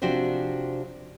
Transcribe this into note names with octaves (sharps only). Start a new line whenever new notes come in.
C3 F3 D4 F#4 G4 C5